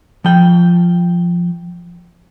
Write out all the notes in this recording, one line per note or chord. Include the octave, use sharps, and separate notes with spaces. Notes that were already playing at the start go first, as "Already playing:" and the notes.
F3 G5